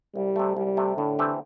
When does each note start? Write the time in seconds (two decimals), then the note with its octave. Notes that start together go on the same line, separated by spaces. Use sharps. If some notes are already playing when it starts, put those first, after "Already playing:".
0.15 C2 G3
0.36 C3 A3
0.56 C2 G3
0.77 C3 A3
0.97 A2 D3
1.19 E3 A3 C4 G4